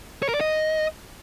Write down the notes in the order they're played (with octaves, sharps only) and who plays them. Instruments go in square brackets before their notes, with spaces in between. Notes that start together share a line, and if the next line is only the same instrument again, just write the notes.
[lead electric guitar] C#5
A#4
D5
D#5